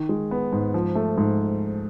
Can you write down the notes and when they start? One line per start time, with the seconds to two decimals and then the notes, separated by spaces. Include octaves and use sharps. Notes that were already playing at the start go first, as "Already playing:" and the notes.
Already playing: D#3
0.09 G#3
0.31 B3
0.52 G#2
0.74 F3
0.95 A3
1.18 G#2